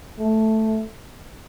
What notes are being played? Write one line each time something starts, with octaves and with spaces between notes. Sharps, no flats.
A3